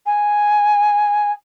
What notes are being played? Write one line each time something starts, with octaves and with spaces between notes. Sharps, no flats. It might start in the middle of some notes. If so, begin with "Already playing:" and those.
G#5